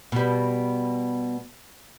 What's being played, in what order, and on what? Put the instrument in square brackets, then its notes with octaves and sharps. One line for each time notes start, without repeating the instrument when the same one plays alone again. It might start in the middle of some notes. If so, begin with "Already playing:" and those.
[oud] B2 G3